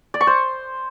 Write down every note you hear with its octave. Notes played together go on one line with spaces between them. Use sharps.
D5
C#6
C5